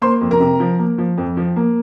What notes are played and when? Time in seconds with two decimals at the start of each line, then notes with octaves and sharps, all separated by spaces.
0.02 A#3 C5 C6
0.21 F2
0.31 A#4 A#5
0.40 C3
0.60 F3
0.79 A#3
0.98 F3
1.18 F2
1.37 F3
1.56 A#3